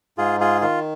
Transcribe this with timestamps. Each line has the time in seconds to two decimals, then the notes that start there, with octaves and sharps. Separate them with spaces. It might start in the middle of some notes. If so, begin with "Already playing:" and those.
0.18 G#2 F4 G#4
0.40 F4 G#4
0.61 D#3 F4